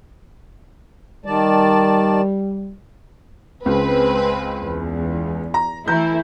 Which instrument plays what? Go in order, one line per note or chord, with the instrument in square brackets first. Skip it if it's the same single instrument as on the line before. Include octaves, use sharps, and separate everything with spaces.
[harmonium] D#3 D5 A5 [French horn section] G3
[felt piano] C#2 [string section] G#3 C4 B4
[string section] E2
[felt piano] A#5
[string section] E3 A3 E4 [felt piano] A#5 G6